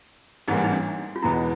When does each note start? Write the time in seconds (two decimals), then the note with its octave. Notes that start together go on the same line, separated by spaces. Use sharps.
0.48 A1 G#2 E3 G3 A#3 D#4
0.64 D#4
0.73 D4
1.16 F4
1.22 E1 E2 B2 G#3 B3 E4